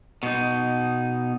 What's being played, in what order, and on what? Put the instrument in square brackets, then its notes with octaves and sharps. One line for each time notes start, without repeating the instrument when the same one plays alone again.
[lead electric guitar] B2 D#4